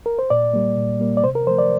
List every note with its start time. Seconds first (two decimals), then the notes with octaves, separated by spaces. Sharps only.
0.06 A#4
0.19 C5
0.30 A#2 D5
0.54 G3 A#3
0.77 A#2
1.00 G3 A#3
1.17 D5
1.23 C3 C5
1.35 A#4
1.47 F3 A3 C5
1.59 D5